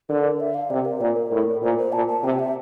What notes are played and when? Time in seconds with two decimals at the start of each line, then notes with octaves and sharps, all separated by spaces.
0.09 D3 A#4
0.40 E5
0.54 F5
0.70 C3 D5
0.85 A#4
1.00 A#2 D5
1.16 A#4
1.32 A2
1.63 A#2 C5
1.78 C5
1.92 A#2 A5
2.08 A5
2.24 C3 G5
2.39 E5